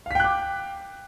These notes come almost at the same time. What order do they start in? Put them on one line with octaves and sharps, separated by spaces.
F5 B6 G5 F#6 D6